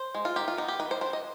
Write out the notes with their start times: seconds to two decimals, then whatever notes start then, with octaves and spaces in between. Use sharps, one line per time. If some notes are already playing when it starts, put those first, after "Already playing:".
Already playing: C5
0.15 G#3
0.25 F4
0.36 D#3 G4
0.48 F4
0.57 B3 D#4
0.68 G4
0.80 D#3 B4
0.91 C5
1.01 D4 C5
1.13 D#5